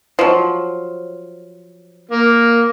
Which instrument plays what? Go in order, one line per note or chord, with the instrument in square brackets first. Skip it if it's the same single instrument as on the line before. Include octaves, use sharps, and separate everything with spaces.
[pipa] F3 F#3
[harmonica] A#3